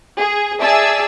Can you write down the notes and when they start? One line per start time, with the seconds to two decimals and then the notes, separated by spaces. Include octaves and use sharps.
0.16 G#4
0.60 G#4 D5 E5 G#5 A5 E6